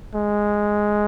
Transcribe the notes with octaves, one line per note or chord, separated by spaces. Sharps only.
G#3